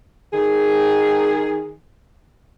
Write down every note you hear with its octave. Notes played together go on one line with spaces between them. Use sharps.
D#3 G#4